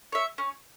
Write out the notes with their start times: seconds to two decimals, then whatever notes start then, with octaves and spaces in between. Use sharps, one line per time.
0.12 C#5 E5
0.38 C#4